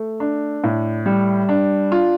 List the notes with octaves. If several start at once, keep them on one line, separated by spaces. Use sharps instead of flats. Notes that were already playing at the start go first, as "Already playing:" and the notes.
Already playing: A3
D4
A2
G3
D4
F4